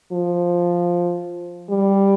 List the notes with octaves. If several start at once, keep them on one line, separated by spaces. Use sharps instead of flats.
F3
G3